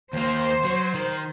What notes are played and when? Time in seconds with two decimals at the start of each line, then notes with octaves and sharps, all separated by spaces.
0.13 D#2 A#3 C5
0.65 F#3
0.94 D#3